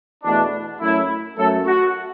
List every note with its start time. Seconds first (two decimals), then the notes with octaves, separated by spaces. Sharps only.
0.23 E2 B2 A3 D4
0.80 F#2 F#3 A3 E4
1.37 F#2 F#3 A3 A4
1.66 F#4